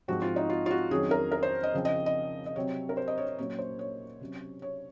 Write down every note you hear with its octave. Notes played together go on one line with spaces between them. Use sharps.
G#2 F3 C4 F#4
F4
D#4
F4
F4
F#4
F2 D#3 F#3 C#4 G#4
A#4
A#4
C5
D#5
C#3 F3 C4
D#5
D#5
D#5
C3 F#3 C4 C#5
A#4
C5
D#5
C#5
C#5
A#2 F#3 A#3 C#4 C#5
C5
C#5
C3 F#3 C#4
C#5